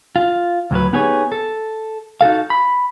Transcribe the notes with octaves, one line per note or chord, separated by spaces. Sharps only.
F4
D2 A2 F#3 B4
B3 D#4 G4 G#4 B4 C#5
A4
D#4 F#4 A4 F5
B5